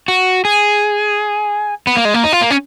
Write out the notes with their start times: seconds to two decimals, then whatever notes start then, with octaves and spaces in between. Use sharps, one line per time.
0.08 F#4
0.45 G#4
1.87 B3
1.97 A#3
2.05 G#3
2.14 A#3
2.24 D#4
2.32 F4
2.41 A#3
2.50 C#4